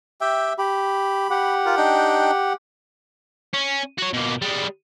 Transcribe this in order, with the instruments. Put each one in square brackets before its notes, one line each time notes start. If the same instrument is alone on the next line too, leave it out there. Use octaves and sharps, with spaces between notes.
[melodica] G4 G5 [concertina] E5
[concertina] G4 [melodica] B5
[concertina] G4 F#5
[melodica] F4 A#4
D4 D#4 G5
[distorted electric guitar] C#4
F#4 C#5
B2 A#3
G3 G#3